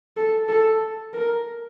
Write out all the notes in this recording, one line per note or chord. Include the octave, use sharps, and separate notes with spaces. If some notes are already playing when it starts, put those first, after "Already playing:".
A4
A4
A#4